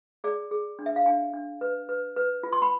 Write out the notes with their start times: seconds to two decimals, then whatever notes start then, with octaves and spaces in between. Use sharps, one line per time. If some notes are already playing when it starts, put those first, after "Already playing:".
0.24 G#4 D5
0.51 G#4
0.79 D4
0.86 E5
0.96 F5
1.06 D4 G#5
1.33 D4
1.61 B4
1.89 B4
2.16 B4
2.43 F4
2.53 C6
2.62 B5